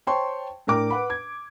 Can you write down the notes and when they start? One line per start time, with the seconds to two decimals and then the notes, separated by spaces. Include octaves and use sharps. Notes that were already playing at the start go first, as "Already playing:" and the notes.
0.07 C5 C#5 G5 A5 C6 C#6
0.67 A2 D4 A#4 G5 D6
0.90 B4 F#5 B5
1.10 G#6